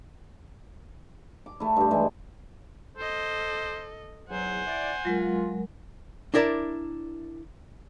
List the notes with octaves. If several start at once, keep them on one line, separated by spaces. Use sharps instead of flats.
D6
A3 E4
G2 G4
E3 G#3 E4
A4 C5 D#5
E2 G#2 F#3 C5 F#5 G#5
E4 D5
F#3 G#3 F4 A#4
D4 E4 A#4 D5